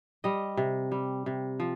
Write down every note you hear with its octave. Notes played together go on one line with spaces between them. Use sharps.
G3 D#5
C3
G3
C3
F3